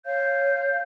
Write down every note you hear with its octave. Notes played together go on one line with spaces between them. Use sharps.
C#5 F5 G6